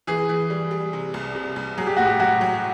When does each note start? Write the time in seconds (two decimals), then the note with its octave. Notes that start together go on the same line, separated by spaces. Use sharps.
0.07 E3 G#4
0.29 E3
0.50 G3
0.71 G3
0.93 C3
1.14 C2
1.35 C3
1.56 C2
1.78 F#3 G#4
1.87 G4
1.97 A2 F#4
2.05 G4
2.19 F#3 F#4
2.41 F#3